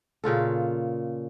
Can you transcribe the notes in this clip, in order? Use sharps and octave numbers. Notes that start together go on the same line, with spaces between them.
A#2 C#3 F4 A4